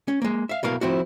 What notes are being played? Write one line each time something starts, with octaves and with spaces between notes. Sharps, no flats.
C#4
G#3 A#3
E5 F5
B1 B2 E4 A#4 F5
F3 C4 E4 F#4